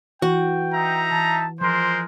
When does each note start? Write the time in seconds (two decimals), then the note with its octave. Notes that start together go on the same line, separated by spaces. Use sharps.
0.22 E3 F#4 G5
0.74 D#4 E5 A#5
1.11 E3 A5
1.61 F3 G#3 A#4 C5 C6